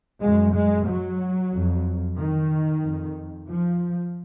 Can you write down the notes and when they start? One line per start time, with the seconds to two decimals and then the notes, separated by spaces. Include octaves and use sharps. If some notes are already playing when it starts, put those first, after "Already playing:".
0.22 F#2 G#3
0.54 G#3
0.88 F#3
1.52 F2
2.17 D#3
2.83 F2
3.49 F3